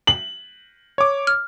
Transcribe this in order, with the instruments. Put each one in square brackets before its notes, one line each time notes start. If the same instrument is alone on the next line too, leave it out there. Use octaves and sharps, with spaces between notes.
[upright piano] F#7
[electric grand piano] C#5 D6
[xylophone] F6